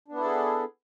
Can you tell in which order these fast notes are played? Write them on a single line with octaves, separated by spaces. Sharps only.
D4 B3 E4 A4 G#4